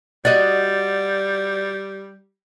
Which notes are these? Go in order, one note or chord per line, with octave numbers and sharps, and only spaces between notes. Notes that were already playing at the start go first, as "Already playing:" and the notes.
G3 F#4 D5 D#5 A6